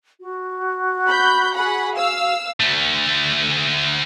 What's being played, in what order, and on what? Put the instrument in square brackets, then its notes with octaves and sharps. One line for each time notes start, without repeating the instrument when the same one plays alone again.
[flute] F#4
[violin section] B5 G6
G#4 F#5 B5
F5 E6
[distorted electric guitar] D2 A3